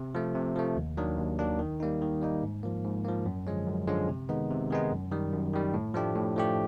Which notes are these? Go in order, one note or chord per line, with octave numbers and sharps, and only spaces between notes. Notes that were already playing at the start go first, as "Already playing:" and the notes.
Already playing: C3
F3 A3
C3
F3 A3
D#2
D#3 F#3 A#3 D4
D#2
D#3 F#3 A#3 D4
D#3
G3 A#3 D#4
D#3
G3 A#3 D#4
G#2
F3 A#3
G#2
F3 A#3
F#2
D3 F3 G#3 C#4
F#2
D3 F3 G#3 C#4
C3
D#3 G#3 B3 D#4
C3
D#3 G#3 B3 D#4
F#2
D#3 G3
F#2
D#3 G3
A2
F3 A3 D4 G4
A2
F3 A3 D4 G4